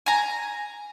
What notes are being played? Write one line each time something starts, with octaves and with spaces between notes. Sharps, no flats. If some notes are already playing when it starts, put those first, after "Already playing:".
G#5 A#5